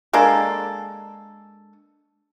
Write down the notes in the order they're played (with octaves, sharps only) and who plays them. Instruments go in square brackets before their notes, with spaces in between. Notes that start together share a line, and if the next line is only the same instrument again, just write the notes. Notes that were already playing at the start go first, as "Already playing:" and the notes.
[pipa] G#3 A#3 D4 A4